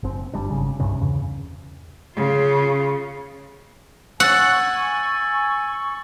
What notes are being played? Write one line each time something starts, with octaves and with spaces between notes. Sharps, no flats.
F#1 C4
G1 G3 D4
G#1 C#3
C2 G2 C3 C#4
E2 C#3
C#3 F4
F#5 G#5 C#6 E6 A6